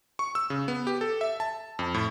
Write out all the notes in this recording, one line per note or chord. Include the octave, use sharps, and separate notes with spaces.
C#6
E6
C#3
B3
G4
A4
E5
A5
F2
A2